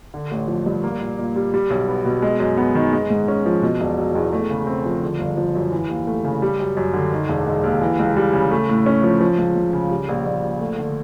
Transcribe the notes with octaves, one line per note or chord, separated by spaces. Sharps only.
D3
A1
F3
G2
A#3
A#2
A#2
G3
G3
B1
B3
B2
G#3
F#2
B3
D#3
G#3
G#2
C#4
F3
B2
E1
F#3
E2
A3
C#3
C4
F3
D3
G1
F3
F#2
E3
D#2
A3
C#3
G3
F#2
F#2
D3
D#3
E1
G#3
D#2
E3
C#2
G3
C#3
A3
A2
C#4
F3
F3
C#2
C#2
C#3
G3
A#1
A#1
A#2
A3
D3